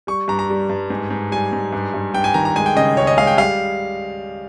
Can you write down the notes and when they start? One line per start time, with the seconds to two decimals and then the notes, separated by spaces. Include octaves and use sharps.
0.07 G3 C#6
0.28 G2 A#5
0.39 A#5
0.50 G3
0.70 G2
0.90 G#2
1.10 G#2
1.32 G3 G#5
1.53 G#2
1.73 G2
1.94 G2
2.14 G2 G5
2.24 G#5
2.34 D#3 A#5
2.45 A#5
2.56 G#3 G#5
2.66 G5
2.76 C#3 D#5
2.97 C#2 C#5
3.07 D#5
3.17 G#3 F5
3.27 G5
3.37 G3 F5